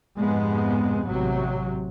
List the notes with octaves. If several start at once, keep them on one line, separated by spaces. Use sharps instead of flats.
F2 G#2 C3 G#3 B3
A1 C3 F#3